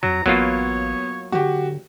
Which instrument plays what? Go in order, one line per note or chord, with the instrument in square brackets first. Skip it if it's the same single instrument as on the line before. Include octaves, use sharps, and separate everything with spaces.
[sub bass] F2 [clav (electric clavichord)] F#3 [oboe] A#5
[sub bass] A1 [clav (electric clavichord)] F#3 A#3 F4 [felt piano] B3 [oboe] C#5
[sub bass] D3 [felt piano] F#4 G4